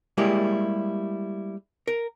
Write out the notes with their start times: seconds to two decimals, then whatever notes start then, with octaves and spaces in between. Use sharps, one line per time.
0.18 G3 G#3 A#3 E4 G4
1.88 A#4